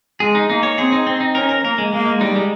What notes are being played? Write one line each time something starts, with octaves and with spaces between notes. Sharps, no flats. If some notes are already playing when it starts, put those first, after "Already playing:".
G#3 G#4
D#4
A#3 D#4
C#5
C4 G#4
D#4
C4
D#4
C#4 A#4
A#4
A#3 A#4
G#3
G#3 A#3
G#3
G3 D#4
G#3